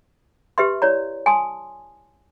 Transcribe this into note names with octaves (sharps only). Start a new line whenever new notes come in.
G4 B4 E5 C6
E4 C#5 D5 A#5
G#5 A5 C6 D#6